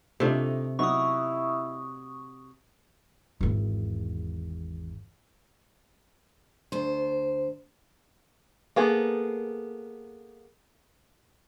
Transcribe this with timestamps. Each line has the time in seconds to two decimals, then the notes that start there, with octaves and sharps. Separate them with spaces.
0.20 C3 A3 D4 D#4 F4
0.79 F#3 B3 D#4 E4 C#6 D#6
3.41 G#1 E2
6.72 D2 C5
8.76 A#3 B3 G#4 A4